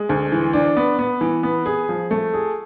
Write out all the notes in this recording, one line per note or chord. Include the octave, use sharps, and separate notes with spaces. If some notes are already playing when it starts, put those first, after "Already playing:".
Already playing: G#3
D2
E3
D4
B3
B3
E3
B3
G#4
F3
A3
G#4